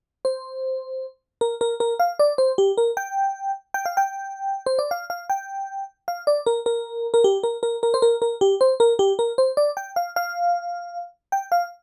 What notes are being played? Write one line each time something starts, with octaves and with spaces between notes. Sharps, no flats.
C5
A#4
A#4
A#4
F5
D5
C5
G4
A#4
G5
G5
F5
G5
C5
D5
F5
F5
G5
F5
D5
A#4
A#4
A#4
G4
A#4
A#4
A#4
C5
A#4
A#4
G4
C5
A#4
G4
A#4
C5
D5
G5
F5
F5
G5
F5